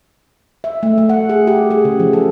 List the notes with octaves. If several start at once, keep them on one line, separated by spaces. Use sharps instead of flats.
E5
A3
A3
F#5
G#4
G4
G#4
C#3
F3
A4